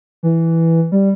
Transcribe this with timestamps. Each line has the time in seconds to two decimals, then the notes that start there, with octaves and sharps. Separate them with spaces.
0.23 E3
0.92 G3